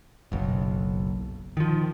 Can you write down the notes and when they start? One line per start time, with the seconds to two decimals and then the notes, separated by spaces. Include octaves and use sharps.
0.32 F#1 B1
1.57 D#3 F3